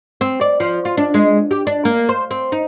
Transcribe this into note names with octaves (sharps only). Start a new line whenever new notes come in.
C4
D5
F3
F4
D4
G#3
G4
D4
A#3
C5
C4
D#4